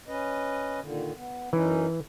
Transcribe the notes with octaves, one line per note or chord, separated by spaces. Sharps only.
C#4 B4 D#5
A#2 D3 D#3
B3
F#2 E3 C#4 D#4